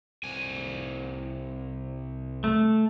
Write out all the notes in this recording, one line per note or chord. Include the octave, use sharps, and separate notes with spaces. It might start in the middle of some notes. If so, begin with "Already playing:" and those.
C2 G#5
A3